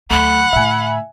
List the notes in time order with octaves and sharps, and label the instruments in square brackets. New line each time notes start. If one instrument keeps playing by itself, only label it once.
[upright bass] D2 F#3 [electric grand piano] A3 [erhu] F#5 [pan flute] B5
[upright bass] A2 D3 [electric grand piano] E5 G#5